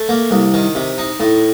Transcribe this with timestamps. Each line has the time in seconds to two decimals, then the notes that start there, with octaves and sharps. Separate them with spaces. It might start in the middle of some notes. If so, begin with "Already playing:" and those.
Already playing: A3
0.09 A#3
0.31 C2
0.54 D#3
0.75 C3
0.98 D#4
1.20 A2